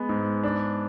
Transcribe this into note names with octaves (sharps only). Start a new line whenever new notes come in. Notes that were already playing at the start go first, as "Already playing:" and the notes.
Already playing: G#3 B3
G#2
D4